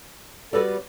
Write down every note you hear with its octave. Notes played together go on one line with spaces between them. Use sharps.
G3 B3 F#4 A4 B4 D5